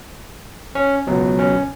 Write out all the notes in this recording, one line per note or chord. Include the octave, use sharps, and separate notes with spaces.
C#4
C#2 B2 F#3
C#4